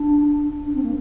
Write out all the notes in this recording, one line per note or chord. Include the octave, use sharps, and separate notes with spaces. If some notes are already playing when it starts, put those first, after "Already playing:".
Already playing: D4
D4
C4
A#3